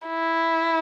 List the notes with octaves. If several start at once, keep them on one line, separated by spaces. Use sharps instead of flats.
E4